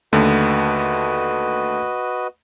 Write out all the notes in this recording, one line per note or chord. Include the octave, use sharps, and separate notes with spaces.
D#2 D3 A3 F#4 B4 D#5